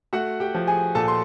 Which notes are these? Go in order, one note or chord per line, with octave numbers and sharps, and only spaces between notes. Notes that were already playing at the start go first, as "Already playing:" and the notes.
A3 F#4 F#5
G4 G5
F3
G#4 G#5
A#2 A4 A5
C6